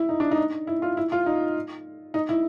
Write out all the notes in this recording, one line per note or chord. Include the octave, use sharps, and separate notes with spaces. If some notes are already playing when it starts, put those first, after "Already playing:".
Already playing: E4
D#4
D4
D#4
E4
F4
E4
F4
D#4
D#4
E4